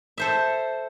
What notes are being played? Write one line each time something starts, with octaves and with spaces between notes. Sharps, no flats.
A4 C5 E5